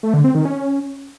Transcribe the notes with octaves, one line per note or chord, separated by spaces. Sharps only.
A3
D3
C4
D#3
C#4